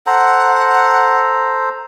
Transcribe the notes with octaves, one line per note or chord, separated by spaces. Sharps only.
A4 C5 F#5 A#5